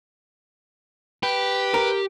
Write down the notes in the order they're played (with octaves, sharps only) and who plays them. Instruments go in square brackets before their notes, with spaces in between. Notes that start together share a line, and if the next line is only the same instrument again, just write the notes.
[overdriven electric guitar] G4 [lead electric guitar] B4
[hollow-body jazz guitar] A#4